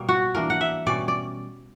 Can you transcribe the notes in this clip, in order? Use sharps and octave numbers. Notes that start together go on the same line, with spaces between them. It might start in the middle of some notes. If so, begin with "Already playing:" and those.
Already playing: B2 G3 A#3
F#4
E3 A#3 D4 A#4
F#5
E5
B2 G3 C#4 D5
D5